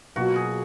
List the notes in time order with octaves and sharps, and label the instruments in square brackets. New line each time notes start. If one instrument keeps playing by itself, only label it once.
[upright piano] B2 F#3 A#3 F4 [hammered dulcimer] F#4
[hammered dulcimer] G#4